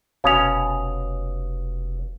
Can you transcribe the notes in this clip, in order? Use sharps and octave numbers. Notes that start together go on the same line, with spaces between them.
F1 B2 C#4 F5 D#6 F7